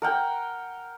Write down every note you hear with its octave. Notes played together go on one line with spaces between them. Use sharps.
A#4 F#5 G5